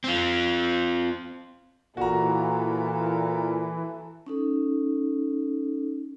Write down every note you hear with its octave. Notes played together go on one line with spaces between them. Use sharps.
C4 F4
A#2 E3 F#4 A4 A#5
C#4 D#4 A4